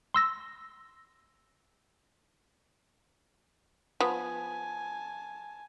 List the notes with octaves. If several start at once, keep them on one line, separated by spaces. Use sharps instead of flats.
C6 E6 A#6
F3 B3 G#5 A5